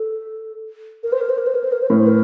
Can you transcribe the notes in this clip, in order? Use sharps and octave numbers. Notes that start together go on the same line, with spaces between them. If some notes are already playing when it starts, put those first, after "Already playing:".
Already playing: A4
A#4
C5
A#4
C5
A#4
C5
A#4
C5
A#4
C5
A2 A#4
C5
A#4